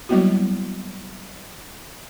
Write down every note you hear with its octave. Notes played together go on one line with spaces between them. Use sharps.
F#3 G3 A#3 B3 E4 F#4